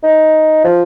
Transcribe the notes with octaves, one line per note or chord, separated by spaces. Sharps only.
D#4
F3